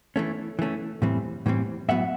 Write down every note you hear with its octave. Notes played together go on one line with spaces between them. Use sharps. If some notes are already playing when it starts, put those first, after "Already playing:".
E3 A3 C#4
E3 A3 C#4
A2 E3 G3 C4
A2 E3 G3 C4
A2 F#3 B3 E5 F#5